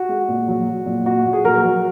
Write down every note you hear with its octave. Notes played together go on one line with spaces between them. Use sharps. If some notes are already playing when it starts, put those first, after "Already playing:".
Already playing: F#4
G#3
A#2
F#3
F#3
A#2
A#2 F#4
A#2
G#4
F#3 F#4 A#4
F#3